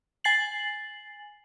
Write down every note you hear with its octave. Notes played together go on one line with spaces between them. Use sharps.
G#5 A6 C7 F#7